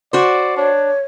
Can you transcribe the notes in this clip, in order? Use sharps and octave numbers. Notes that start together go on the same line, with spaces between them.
F#4 C5 D5
D4 C#5